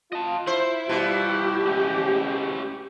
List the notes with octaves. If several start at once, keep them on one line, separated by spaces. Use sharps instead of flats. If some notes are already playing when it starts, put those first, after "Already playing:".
F4 D#5 A5
E4 C5
B2 G3 F4 G4
F2 C#3 G#3 C#4 E4